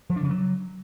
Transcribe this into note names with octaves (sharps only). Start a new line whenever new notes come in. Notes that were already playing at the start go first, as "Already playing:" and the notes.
F3
D4
C#3
F#3